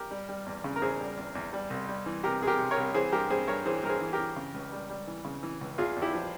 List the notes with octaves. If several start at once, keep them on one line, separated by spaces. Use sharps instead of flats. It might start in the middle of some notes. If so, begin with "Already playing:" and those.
Already playing: G4 A#4
G3
G3
E2
C#3
A#4
E2 G#4 C5
G3
E2
E2
G3
C2
G3
E3
C3 G4 A#4
C3 G#4
G4 A#4
C3
A#4 C#5
C2
E3 G#4 C5
G2 G4 A#4
G2 G#4 C5
G2 A#4 C#5
E3 G#4 C5
G2 A#4
G#4 C5
E3
G4 A#4
E3
C#3
C#2
G3
G3
E3
C#3
E3
C#2
E2 F4 G#4
E2
E4 G4
F3